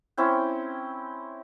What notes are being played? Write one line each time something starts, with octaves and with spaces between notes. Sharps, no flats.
C4 C#4 E4 G5